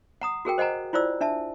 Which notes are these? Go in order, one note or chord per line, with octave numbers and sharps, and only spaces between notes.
F#5 A#5 D#6
F#4 G#4 A#4 G5
C5 D#5 F#5 G#5 A#5
E4 F4 C5 D5 E6
D4 E5 A5